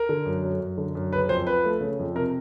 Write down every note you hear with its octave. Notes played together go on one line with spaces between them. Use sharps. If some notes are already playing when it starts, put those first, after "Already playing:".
Already playing: A#4
D3
F#2
F#3
F#2
D3
F#2
C#3 B4
F2 C5
F3 B4
A3
C#3
F2
C3 A#4